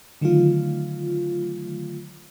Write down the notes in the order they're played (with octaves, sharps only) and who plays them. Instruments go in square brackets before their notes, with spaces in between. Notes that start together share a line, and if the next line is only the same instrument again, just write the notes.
[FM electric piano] D3 D#3 F#3 A3 F4